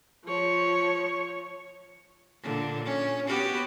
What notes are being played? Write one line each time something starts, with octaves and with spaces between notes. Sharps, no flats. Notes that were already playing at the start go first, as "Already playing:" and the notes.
F3 C#5
A#2 D3
C#4
B3 F#4 G4